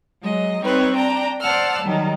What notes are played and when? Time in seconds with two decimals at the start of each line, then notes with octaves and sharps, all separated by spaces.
0.20 F#3 G#3 D#5
0.61 G3 C4 D#4 B4 C#5
0.95 D4 G5 A#5
1.40 C5 D5 F#5 A5 E6 F6
1.81 D#3 F#3 G3